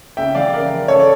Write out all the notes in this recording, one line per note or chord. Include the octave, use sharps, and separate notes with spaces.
C#3 E5 G5
E3 D5 F5
C#3 A#4 D5
F3
C#3 A4 C#5
D5